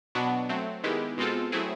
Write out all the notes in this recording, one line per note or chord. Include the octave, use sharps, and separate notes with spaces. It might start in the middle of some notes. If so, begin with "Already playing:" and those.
B2 F#3 B3 D4 F#4
F#3 A3 C4
D#3 G#3 B3 E4 G4
B2 G#3 C4 F4 A4
F#3 A3 C4 E4 G#4